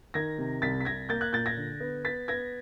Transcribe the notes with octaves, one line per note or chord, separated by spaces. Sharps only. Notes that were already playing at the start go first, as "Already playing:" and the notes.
D#3 G#6 A#6
C3
C2 A6 B6
B6
C2 G#6 A#6
A#3 G6 A6
F#6 G#6
A#2 G6 A6
G#6 A#6
D3
B3
B3 A6 B6
B3 G#6 A#6